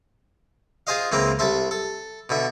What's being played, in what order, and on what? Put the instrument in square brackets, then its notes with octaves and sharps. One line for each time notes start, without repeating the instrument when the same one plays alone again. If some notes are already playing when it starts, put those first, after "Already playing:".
[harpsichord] F4 G#4 C5 D#5 F5
C#2 E3 A#3 C4 A#5
C2 A4 E5 C6
A4
B2 D3 E5